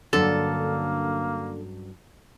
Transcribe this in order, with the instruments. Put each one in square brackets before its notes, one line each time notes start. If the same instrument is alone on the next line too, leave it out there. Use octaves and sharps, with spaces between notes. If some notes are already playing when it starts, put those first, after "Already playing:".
[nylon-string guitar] G2 F#3 C#4 [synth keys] D3 [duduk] A#3 [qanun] A4